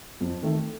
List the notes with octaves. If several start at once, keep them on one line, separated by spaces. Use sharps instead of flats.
F2
D#3 A3